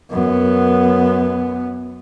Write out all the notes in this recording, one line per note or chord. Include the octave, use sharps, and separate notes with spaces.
F#2 B3